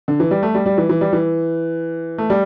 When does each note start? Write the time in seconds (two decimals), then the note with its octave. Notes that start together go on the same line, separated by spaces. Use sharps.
0.08 D3
0.20 E3
0.31 G3
0.43 A3
0.54 G3
0.66 G3
0.78 E3
0.89 E3
1.01 G3
1.13 E3
2.18 A3
2.30 G3